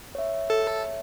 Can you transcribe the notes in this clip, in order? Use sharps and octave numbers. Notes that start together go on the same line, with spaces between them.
C#5 E5
A4